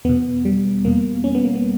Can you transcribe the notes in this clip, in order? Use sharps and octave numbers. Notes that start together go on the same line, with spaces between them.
E2 B2 B3
G3
E2 B2 A#3
C#4
B3
A#3
B3